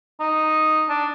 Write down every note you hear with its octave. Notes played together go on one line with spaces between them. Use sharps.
D#4
D4